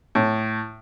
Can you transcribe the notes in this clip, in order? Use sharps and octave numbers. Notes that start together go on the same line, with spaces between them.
A2